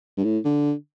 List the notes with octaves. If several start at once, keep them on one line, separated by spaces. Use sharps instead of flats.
G2
A2
D3